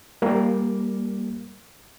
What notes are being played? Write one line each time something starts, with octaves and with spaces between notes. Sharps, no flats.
G3 A#3